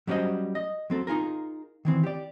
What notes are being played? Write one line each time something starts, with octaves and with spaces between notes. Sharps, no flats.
F#3 G3 C#4 C5 D#5
D#5
F#3 C4 A4
D#4 F4 G#4 A#4
D#3 E3 C4
G4 D5